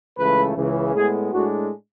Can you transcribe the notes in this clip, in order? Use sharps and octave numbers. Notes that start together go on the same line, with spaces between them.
C#2 C#3 E3 A3 B4
C#2 C#3 E3
A2 G#3 B3 G#4
A2 G#3 D4 F#4